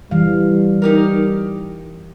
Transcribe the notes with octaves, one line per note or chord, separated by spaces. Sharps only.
E3 G3 F5
D#4 G4 A#4